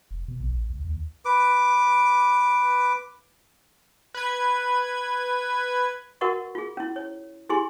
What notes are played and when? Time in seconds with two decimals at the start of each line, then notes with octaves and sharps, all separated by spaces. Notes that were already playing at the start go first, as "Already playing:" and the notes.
0.11 F1
0.28 B2
0.40 A#1
0.52 A1
0.70 C#2
0.84 D#2
1.25 B4 D6
4.14 B4 G#6
6.21 F#4 A#4 B4 D#5 F#5 C#6
6.55 F4 G#4
6.77 C#4 E4
6.96 C#5
7.49 E4 G4 G#4 G#5 C6